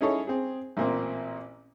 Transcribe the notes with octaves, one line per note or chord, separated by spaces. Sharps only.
C#4 D#4 E4 G#4 A4 C#5
C4 G#4
A1 A#2 A#3 C4